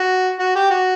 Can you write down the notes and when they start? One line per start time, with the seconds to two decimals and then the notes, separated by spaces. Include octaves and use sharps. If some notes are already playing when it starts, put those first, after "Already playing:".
Already playing: F#4
0.40 F#4
0.55 G4
0.71 F#4